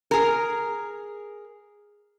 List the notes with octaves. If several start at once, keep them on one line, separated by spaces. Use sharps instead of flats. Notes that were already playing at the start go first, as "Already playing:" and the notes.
G#4 A#4